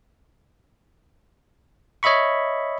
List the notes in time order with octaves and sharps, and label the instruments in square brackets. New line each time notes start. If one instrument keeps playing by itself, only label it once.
[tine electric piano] C#5 D#5 E5 B5 C#6